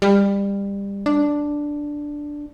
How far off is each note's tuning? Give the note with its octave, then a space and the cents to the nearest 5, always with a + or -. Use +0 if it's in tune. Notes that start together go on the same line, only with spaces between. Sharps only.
G3 +25
D4 +0